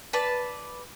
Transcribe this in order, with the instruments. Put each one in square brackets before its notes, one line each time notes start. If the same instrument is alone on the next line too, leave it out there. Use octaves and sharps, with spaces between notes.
[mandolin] B4 D5 A5